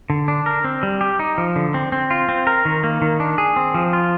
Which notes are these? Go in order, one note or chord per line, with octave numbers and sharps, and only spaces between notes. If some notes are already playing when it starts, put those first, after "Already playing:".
D3
D4
A#4
C4
G3
G4
D#4
F3
D3
C4
C4
F4
C4
A#4
D#3
A#3
D#3
D4
G#4
C4
F3
F4